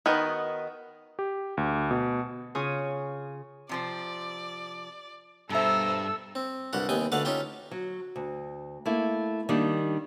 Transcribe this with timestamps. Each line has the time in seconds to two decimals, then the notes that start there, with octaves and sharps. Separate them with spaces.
0.06 D#3 B3 F#4 B4 D#5
1.19 G4
1.57 D2
1.91 B2
2.55 C#3 F4 C#5 G#5 D#6
3.69 C3 F3 C5 D5
5.50 G2 B2 A4 C5 E5 A#5 E6
6.35 C4
6.73 C2 G2 G3 F#4 G4 F#5
6.89 D#2 C3 B3 G5 G#5 D#6
7.12 D2 A3 B4 D5 F5 F#5
7.25 C#4 D#4 F4 G4 E5 G5
7.71 F#3
8.16 D2
8.86 A3 A#3 E4
9.49 D#3 G3 A#3 D4